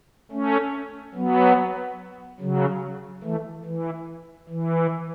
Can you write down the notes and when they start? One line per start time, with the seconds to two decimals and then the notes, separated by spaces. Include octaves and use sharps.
0.31 A3 C#4
1.15 F#3 B3
2.40 C#3 F#3
3.23 E3 A3
3.65 E3
4.49 E3